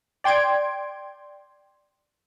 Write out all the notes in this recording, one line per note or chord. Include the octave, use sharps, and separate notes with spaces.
D5 G5 C6 G#6 D7